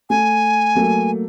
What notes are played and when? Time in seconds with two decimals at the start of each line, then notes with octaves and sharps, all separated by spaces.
0.10 A3 G#5
0.75 F#3 A3 A#3